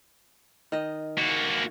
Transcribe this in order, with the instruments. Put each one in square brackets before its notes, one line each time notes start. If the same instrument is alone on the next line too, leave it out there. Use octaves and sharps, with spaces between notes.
[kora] D#3 D#5
[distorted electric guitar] A#3 F#4